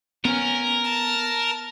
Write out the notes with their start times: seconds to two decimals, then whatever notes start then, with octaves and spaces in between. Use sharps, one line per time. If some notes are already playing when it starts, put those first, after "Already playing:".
0.25 B3 C#4 A#4
0.84 A5